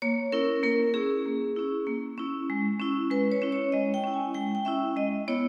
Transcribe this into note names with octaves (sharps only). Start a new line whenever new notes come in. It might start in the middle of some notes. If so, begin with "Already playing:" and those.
A#3 C#5
C#4 E4 A#4
A#3 A#4
C#4 E4 G#4
A#3
C#4 E4
A#3
C#4 E4
G#3
C#4 E4
G#3 B4
C#5
C#4 E4
C#5
G#3 D#5
G5
C#4 E4
G#5
G#3 G5
G5
C#4 E4 E5
G#3 D#5
B3 E4 C#5